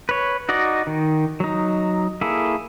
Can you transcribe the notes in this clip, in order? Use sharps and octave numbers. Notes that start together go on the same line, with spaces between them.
B4 C#5
D#4 F#4 D5 D#5
D#3
F#3 D#4
A#3 E4 G#4 A4